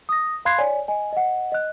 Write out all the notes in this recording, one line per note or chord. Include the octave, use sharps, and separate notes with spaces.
D#6 A#6
F5 B5 C6 F#6 G#6 C7
C#5 D5 G#5
D#5 G#5
D#5 F#5
D#5 F#6